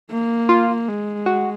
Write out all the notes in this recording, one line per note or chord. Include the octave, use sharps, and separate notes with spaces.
A#3
F4
G#3
F#4